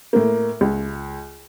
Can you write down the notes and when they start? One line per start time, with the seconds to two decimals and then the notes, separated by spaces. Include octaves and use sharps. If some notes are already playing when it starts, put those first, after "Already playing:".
0.13 A2 A#3
0.61 C#2